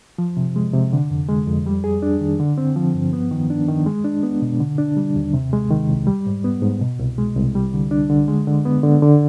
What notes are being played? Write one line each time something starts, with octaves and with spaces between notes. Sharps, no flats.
F3
C3
G#3
C3
D3
F2
G#3
F2
G3
G#4
D4
D#3
D3
C4
F3
G2
B3
D#3
D4
D#3
G#3
D4
B3
B2
D3
D4
G3
D#2
C3
G#3
D#3
C2
G3
G#2
B3
G#2
B2
C2
G#3
C2
G3
D3
D4
D3
G#3
D3
B3
D3
D3